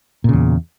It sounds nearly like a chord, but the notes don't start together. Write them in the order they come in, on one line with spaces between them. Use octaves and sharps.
A#2 C#3 E2